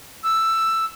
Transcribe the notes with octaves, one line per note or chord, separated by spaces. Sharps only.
E6